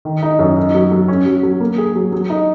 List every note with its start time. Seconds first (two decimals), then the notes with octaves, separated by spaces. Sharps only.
0.05 D#3
0.23 D#4
0.39 F#2
0.57 D#4
0.74 F#3
0.92 F#3
1.08 C#4
1.26 F#3
1.43 F#3
1.60 A#3
1.78 G#4
1.96 F#3
2.13 F#3
2.30 D#4